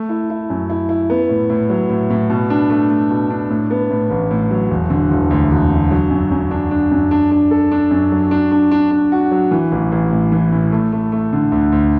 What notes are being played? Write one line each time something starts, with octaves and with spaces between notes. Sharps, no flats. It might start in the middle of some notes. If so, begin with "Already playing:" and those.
Already playing: A3
E4
E4
F#2
E4
E4
B3
A2
A2
F#3
A2
A2
B2
D4
A3
A3
B2
D4
A2
B3
A2
A1
A2
F#3
E1
D3
E1
D2
E1
D3
F#3
F#2
F#2
D4
D4
F#2
D4
D4
A4
D4
F#2
F#3
D4
D4
D4
D4
F#4
F#3
E3
A1
A1
A2
E3
A2
A3
A3
A3
D3
D2
D2